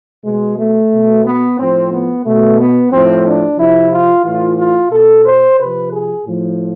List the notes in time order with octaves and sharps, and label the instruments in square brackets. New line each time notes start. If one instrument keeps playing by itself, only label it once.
[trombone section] B2 G#3
A3
B2
B3
A2 F3 C4
B3
B2 A3
B3
A2 F3 C4
D4
C3 F3 E4
F4
A2 E3 F4
F4
B2 A4
C5
C3 F3 B4
G#4
A2 F3